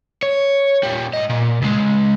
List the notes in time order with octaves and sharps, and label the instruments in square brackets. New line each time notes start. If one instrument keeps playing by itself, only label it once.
[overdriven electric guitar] C#5
A#2 G3
G#2 D#5
A#2
C#2 G#3